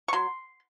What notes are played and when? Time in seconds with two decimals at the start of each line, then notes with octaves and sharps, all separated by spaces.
0.08 C#6
0.13 F#3 C6